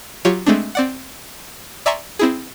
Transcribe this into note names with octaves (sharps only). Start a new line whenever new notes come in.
F#3 F4 G4 C#5
G#3 A3 C4 D4
C4 D5 F#5
D5 E5 G#5 A#5 C6 C#6
C4 E4 G#4